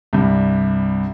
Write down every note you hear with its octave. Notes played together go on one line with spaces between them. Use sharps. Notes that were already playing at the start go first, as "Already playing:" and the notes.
C2 G2